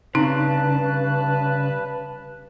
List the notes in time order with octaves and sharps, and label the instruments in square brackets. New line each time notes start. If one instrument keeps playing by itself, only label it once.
[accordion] G2 A5 F#6 [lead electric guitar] C#3 [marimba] C4 D#4 [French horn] B4